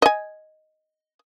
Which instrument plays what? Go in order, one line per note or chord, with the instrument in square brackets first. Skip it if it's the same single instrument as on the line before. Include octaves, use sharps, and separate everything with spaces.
[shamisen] D#5 G#5